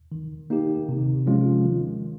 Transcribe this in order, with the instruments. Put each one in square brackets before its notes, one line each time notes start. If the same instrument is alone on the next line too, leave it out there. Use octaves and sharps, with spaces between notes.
[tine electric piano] D#3
A#3 D#4 G4
C3
F3 G#3 C#4 F4
D#3